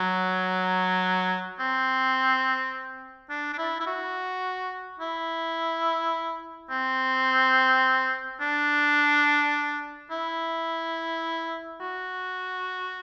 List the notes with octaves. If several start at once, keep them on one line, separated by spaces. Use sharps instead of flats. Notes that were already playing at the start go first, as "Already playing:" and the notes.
Already playing: F#3
C4
D4
D4
E4
E4
F#4
E4
C4
D4
E4
F#4